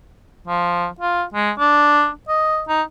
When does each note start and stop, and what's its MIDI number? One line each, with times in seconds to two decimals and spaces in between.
0.47 0.87 53
1.00 1.24 65
1.34 1.51 56
1.59 2.10 62
2.29 2.63 75
2.68 2.82 63